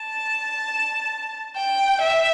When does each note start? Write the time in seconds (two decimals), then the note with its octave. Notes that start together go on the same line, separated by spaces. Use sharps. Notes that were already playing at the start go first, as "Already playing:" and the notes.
Already playing: A5
1.56 G5
2.01 E5